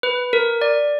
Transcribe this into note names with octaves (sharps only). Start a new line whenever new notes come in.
B4
A#4
D5